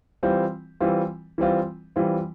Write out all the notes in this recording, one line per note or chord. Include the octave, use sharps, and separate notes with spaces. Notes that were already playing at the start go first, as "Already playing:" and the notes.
E3 G3 C4 F4
E3 G3 C4 F4
E3 G3 C4 F4
E3 G3 C4 F4